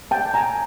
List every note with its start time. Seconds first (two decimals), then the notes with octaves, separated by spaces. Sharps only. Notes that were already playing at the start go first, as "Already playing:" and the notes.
0.11 G5 A5
0.34 G#5 A#5